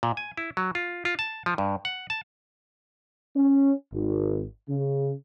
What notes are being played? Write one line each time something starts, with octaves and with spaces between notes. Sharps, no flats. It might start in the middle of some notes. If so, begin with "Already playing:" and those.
A#2
G#5
E4
F#3
F4
F4
A5
F3
G2
F#5
A5
C#4
G#1
C#3